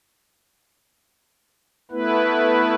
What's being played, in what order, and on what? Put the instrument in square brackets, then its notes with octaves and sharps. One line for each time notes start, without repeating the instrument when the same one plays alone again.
[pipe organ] A3 B3 E4 B4